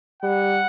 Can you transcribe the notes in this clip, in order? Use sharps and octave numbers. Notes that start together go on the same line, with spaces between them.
G3 F#5